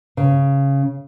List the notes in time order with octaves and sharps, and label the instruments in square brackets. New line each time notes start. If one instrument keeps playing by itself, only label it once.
[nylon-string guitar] C#3